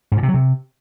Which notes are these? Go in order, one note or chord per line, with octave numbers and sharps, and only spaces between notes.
G#2
A#2
C3
F#3
C3